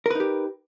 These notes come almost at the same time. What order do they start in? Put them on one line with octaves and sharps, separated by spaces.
A#4 B4 D#4 G4